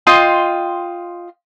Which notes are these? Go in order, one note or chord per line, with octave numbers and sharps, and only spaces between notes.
F4 D#5 G5 C6